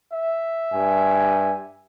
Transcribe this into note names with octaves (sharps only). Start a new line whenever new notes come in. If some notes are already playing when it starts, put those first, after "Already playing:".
E5
G2 G#5